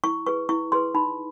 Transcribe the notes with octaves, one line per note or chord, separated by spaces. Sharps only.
E4 C#6
G#4 B4 C#6
E4 C#6
G#4 B4 C6
D#4 B5